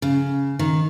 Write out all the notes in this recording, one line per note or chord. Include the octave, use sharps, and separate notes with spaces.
C#3
D#3